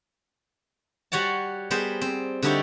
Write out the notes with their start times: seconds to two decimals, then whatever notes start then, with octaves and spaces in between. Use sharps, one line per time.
1.12 G3 F#4 C#5 F#5 A5
1.71 G3 B3 G#4 A#4 C5
2.01 C4
2.42 D3 G3 D#4 E4 G4 C#5